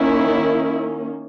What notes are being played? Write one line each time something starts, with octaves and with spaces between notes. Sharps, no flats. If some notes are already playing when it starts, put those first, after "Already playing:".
Already playing: D#3 A#3 C#4 E4